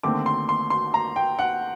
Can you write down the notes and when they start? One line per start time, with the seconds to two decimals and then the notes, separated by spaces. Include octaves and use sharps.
0.03 D#2 D3 A3 C4 D6
0.26 C6
0.49 C6
0.70 C6
0.94 A#5
1.16 G5
1.39 F#5